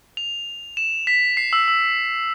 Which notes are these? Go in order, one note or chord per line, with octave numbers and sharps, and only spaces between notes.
F7
E7
B6
C7
E6
E6